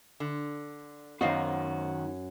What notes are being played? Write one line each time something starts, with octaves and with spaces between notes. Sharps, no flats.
D3
F#2 D#3 B3 F#4 C5 D#5 F5